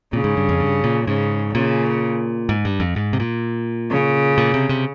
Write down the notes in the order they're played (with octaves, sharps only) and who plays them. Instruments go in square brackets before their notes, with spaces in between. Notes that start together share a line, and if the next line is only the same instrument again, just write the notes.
[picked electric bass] A#2 [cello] C#3
[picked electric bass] G#2
G2
F2
G2
A#2
[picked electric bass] G#2 [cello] C#3
[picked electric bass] A#2 [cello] C#3
[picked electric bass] G#2
G2
F2
G#2
C3
A#2
[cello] C#3
[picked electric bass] A#2
C3
C3